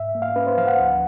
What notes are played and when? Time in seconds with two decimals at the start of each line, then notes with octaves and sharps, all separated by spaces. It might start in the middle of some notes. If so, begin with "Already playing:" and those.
Already playing: G#2 E5
0.15 A#3
0.22 F5
0.36 C#4 B4
0.47 C5
0.58 F3 F5
0.67 F#5
0.78 D2